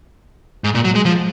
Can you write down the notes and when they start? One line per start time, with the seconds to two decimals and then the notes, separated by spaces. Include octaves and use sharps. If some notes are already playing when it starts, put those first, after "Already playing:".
0.64 G#2
0.75 A#2
0.84 F#3
0.95 G#3
1.05 F3